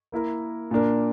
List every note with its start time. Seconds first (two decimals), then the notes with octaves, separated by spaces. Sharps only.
0.12 A#3 E4 A#4
0.71 A#2 A#3 D4 A#4